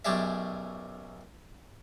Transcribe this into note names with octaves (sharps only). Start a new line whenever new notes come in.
B1 F#2 G4 G#4 D5 E5